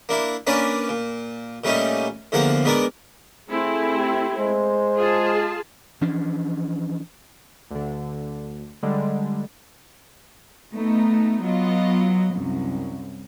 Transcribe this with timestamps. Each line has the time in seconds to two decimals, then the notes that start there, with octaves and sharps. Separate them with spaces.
0.09 A#3 D4 E4
0.47 A#3 C#4 D4 B4 D5
0.89 A#2
1.64 A#2 G3 A3 C#4 D#4
2.32 E2 D3 F3 A#3 F5 F#5
2.64 G#2 B3 D4 A#4 D5
3.49 A3 C4 E4 G#4
3.95 G4
4.38 G#3 C5
4.96 F4 G#4 A5
6.01 E3 F3 C#4 D4
7.71 D2 D3
8.83 D3 G3 G#3
10.73 A3 B3 D#4
11.43 F#3 B3 F4 D#5
12.34 C2 F#2